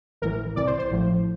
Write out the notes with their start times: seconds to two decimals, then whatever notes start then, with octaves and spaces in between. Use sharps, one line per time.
0.22 A1 A2 E3 A#4
0.56 C2 C3 E3 D5
0.67 C5
0.79 C5
0.90 A1 A2 F3